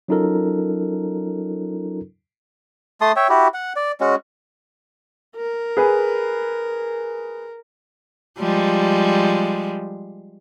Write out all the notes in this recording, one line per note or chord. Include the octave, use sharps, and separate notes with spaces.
F#3 C#4 D#4 F4 A4 A#4
A3 A5 C6 D#6
C#5 E5 G5
E4 F#4 G4
F#5
D5
G#3 C#4 F#4
A#4
G#4 B4
F3 G3 G#3